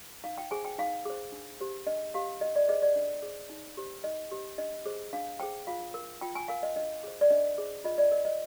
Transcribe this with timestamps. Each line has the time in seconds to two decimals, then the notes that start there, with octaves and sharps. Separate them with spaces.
0.24 D#4 F5
0.38 G5
0.51 G#4 C5 G#5
0.65 G5
0.78 D#4 F5
1.05 G#4 C5
1.32 D4
1.61 G4 C5
1.87 D4 D#5
2.14 G4 C5 F5
2.41 D4 D#5
2.56 D5
2.68 G#4 C5 D#5
2.82 D5
2.96 D4
3.22 G#4 C5
3.50 D#4
3.77 G4 C5
4.04 D#4 D#5
4.31 G4 C5
4.58 D4 D#5
4.86 G#4 C5
5.13 D4 F5
5.40 G#4 C5 G5
5.67 F4 F5
5.94 A#4
6.21 F4 G5
6.35 G#5
6.48 A#4 F5
6.63 D#5
6.76 D4 D#5
7.03 G#4 C5
7.21 D5
7.30 D4 D#5
7.58 G#4 C5
7.84 F4 D#5
7.98 D5
8.11 A#4 D#5
8.25 D#5